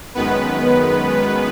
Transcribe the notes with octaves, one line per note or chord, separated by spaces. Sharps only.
F#2 D#3 G#3 B3 B4